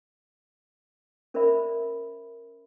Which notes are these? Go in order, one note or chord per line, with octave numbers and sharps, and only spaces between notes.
C#4 A#4 C5 D5 E5 B5